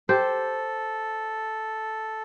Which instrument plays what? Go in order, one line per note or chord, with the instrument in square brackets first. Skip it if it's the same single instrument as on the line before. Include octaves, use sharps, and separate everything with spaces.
[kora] G4 C5 G5 [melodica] A4